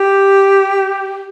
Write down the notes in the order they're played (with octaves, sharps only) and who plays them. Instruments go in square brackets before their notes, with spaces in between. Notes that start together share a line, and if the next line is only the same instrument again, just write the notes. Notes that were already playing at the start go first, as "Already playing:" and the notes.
Already playing: [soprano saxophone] G4